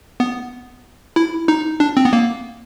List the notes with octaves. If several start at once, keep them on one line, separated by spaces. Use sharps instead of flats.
B3
E4
D#4
D4
C4
B3
A#3